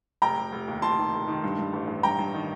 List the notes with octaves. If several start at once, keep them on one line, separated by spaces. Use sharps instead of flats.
F1 G5 A#5
F1
F1
D#2
F1 A5 C6
D#3
F1
D#3
G2
G2
A1
A1
G2 G5 A#5
G2
D#3